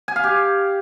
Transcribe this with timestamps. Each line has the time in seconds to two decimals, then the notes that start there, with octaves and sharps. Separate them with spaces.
0.08 G#5
0.16 F5
0.24 G4